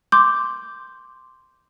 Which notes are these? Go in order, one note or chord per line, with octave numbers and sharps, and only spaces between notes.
C6 D6 G6